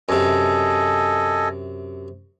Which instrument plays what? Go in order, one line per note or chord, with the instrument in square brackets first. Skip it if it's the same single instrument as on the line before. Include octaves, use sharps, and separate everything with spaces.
[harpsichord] F#2 C3 [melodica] A4 D#5 G#5